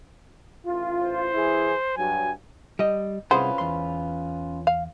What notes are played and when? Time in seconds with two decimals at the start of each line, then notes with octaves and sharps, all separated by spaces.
0.66 A1 F4
1.00 C5
1.33 E3 E4 G#4
1.97 G2 F#3 G#5
2.79 G3 D#5
3.31 C2 C#4 F4 G#4 B4 C5 F#5
3.58 E2 C6
4.67 F5